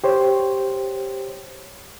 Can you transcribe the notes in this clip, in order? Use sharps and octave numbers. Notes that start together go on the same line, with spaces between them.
G4 C5 C#5